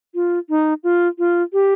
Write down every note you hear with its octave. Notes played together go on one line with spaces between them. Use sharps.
F4
D#4
F4
F4
G4